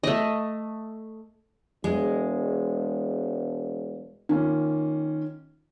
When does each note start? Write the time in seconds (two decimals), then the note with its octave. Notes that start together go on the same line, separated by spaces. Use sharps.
0.03 A3 D#5
1.84 E1 G#3
4.29 D#3 A#3 C#4 F4